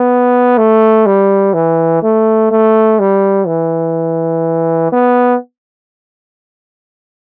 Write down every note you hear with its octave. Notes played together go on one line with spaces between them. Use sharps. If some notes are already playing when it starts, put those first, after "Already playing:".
Already playing: B3
A3
G3
E3
A3
A3
G3
E3
B3